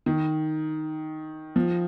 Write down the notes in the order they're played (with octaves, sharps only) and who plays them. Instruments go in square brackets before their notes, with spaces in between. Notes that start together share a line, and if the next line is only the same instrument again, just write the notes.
[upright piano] D#3
F3